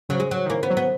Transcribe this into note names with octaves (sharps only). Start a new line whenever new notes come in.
C#3 F#3
G#3
F#3
D#3
E3 A#3
B3
F#3
B3